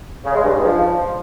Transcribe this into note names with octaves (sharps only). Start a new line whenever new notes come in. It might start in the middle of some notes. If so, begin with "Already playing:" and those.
C#3
G#3
G2
G#2
F3